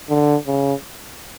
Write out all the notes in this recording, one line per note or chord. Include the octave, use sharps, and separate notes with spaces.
D3
C#3